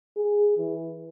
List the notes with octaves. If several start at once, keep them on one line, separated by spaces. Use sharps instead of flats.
G#4
E3